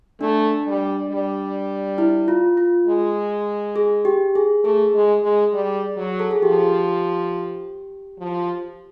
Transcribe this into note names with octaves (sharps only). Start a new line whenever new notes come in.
A3 D4
G3
G3
E4
F4
F4
G#3
G#4
G4
G#4
A3 G#4
G#3
G#3
G3
F#3
A4
G#4
F3 G4
F3